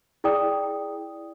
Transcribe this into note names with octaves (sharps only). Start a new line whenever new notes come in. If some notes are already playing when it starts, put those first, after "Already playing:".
E4 G#4 D5 G5 D#6